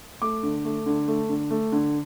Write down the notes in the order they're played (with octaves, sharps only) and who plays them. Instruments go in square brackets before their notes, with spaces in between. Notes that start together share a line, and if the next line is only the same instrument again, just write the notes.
[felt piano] A3 D6
D3
A3
D3
A3
D3
A3
D3